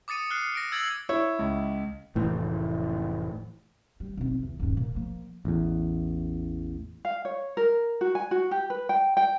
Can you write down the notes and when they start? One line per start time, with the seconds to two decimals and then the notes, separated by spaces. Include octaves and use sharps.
0.08 D6 D#6 A6 C#7 D#7
0.30 F6 F#6 C7 C#7
0.55 A#6 D7
0.72 E6 G#6 A6 C7 F#7
1.09 E4 C#5
1.39 C#2
2.15 F1 A2 E3
4.00 G3
4.17 B1 C4
4.43 E2
4.59 D#1 G2
4.77 A#2
4.95 F3 A#3
5.45 A1 E2
7.05 F5
7.25 C#5
7.57 A#4
8.01 F#4
8.15 G#5
8.31 F#4
8.51 G4
8.70 B4
8.89 G5
9.17 G5